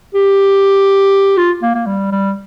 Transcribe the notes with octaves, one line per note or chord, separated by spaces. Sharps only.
G4
F4
A#3
A#3
G3
G3